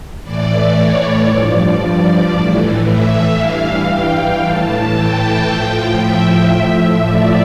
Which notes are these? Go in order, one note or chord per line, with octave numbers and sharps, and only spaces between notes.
A2 E3 D5
C#5
G2 F3 D5
A2 E3
E5
G2 E3 F5
G5
A2 E3 A5
G5
A2 F3
E5
A2 F3
D5